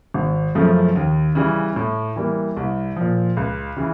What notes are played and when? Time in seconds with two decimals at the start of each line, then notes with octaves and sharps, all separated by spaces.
0.14 G#1
0.55 F#2 C#3 F3 A3
0.96 D#2
1.35 C#3 E3 G3
1.76 A2
2.16 E3 G3 A#3
2.57 C2
2.96 A#2 F3
3.37 C#2
3.77 C#3 E3